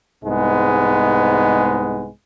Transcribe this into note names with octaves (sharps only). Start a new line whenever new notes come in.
C2 G#2 G#3 B3